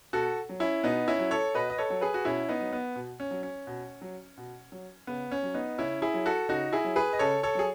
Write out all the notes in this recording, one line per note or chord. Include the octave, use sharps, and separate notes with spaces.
B2 F#4 A4
F#3
C#4 E4
B2 B3 D#4
C#4 E4
F#3
A4 C#5
B2 B4 D#5
D#5
A4 C#5
F#3
G#4 B4
F#4
B2 C#4 E4
B3 D#4
F#3
B3
B2
C#4
F#3
C#4
B2
F#3
B2
F#3
C#3 B3
C#4
F#3
B3 D#4
C#3 C#4 E4
E4 G#4
F#3
F#4 A4
C#3 D#4 F#4
E4 G#4
F#3
G#4 B4
D#5
C#3 A4 C#5
A4 C#5
F#3 G#4